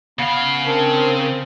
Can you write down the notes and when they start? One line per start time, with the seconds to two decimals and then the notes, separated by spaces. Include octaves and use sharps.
0.19 C#3 B3 F5
0.65 C4 D4 A#4